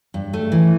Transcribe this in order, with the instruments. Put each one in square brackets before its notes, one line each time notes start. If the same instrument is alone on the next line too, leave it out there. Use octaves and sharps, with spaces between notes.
[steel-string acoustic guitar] G2
A3
E3